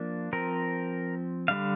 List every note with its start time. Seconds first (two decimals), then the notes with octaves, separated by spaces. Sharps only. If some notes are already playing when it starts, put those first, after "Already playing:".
Already playing: F3 A#3 D4
0.33 F3 C4 A#4
1.48 D3 G3 D4 F5